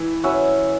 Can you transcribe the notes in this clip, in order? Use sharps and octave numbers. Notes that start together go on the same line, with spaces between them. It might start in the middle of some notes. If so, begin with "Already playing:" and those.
Already playing: E3
C#4 F#4 B4 E5